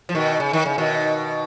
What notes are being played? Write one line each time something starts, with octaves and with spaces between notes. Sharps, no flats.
F3
B2 D#3
C#3
D#3
C#3
B2 D#3